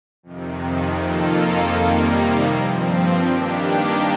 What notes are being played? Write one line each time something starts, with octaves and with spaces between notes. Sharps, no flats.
F2 C3 D#3
F2 D#3 A#3 F4 A4
C3 D#3 G3 A#3
G2 F3 C4
G2 D#3 A#3 D4 G4